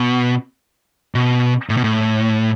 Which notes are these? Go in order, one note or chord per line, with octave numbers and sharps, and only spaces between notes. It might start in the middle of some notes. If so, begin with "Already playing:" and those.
Already playing: B2
B2
A2
B2
A2